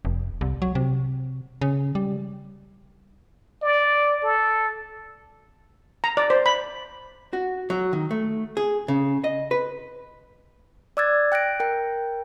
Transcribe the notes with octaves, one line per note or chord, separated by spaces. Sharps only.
F1
C2
F#3
C3
C#3
G3
D5
A4
A#5
D5
C5
B5
F#4
F#3
D#3
A3
G#4
C#3
D#5
B4
D5 D6 E6 F#6 G#6 A6
G5 F#6 A#6 D7
A#4 G5